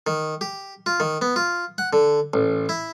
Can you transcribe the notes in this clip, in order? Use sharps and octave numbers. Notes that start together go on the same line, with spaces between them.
D#3
G4
F4
D#3
B3
F4
F#5
D3
A1
E4